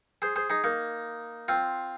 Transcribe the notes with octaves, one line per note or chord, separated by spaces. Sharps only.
G#4 C5
G#4 C5
D#4 G#4
A#3 D#4
C4 F4